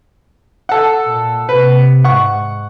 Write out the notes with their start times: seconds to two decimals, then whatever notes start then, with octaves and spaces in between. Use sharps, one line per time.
0.69 A4 F#5
1.04 A#2
1.49 C3 B4
2.04 G#2 F#5 C#6